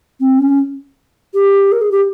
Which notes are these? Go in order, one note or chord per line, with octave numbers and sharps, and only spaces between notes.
C4
C#4
G4
A#4
G#4
G4